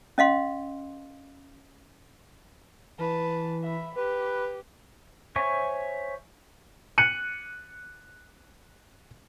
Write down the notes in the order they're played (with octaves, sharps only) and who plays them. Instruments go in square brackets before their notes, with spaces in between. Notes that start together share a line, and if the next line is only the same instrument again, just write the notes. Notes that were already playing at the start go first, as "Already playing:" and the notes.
[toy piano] C#4 D#5 F5 C6
[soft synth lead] E3 [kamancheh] B4 A5
[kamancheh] E5 B5
[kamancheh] G4 [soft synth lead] B4
[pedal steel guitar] C5 C#5 E5 G#5 C#6
[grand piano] F#6 C#7 D#7 F#7